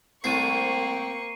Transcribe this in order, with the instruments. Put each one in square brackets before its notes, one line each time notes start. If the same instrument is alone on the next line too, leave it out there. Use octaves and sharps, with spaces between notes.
[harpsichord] C2 A3 E4 [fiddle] A#3 C#6 [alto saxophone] C4 [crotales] C7 D#7